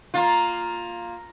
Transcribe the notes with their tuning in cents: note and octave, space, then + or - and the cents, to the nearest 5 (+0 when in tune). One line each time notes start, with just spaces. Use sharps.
A#3 +0 F4 +5